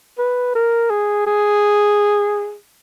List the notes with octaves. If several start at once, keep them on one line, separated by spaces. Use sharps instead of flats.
B4
A#4
G#4
G#4